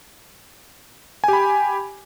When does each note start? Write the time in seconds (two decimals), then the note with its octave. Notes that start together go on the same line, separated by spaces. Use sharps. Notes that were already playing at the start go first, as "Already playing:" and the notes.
1.24 G#5
1.28 G4
1.33 B5